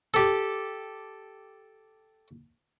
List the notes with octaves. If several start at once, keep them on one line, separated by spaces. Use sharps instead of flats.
G4 A4